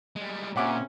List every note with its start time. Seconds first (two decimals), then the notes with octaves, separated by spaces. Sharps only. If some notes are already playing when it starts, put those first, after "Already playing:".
0.16 G3 G#3
0.56 A#2 C#3 C4 C#4 E5 F#5 D6